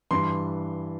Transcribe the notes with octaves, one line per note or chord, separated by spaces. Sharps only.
G2 E3 C6